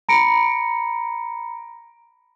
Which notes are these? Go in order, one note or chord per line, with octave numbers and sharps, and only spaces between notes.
A#5 B5 A#6 C#7 D7